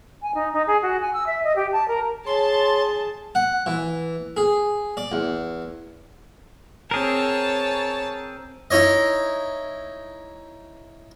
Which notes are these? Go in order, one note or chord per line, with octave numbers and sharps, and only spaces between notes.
G#5
D#4
D#4
G#4
F#4
G#5
E6
E5
D#5
G4
A5
A#4
G#4 C#5 A5 C6
F#5
E3
G#4
D5
E2
C4 G#4 A#4 C#5 A5
D#4 E4 C#5 D#5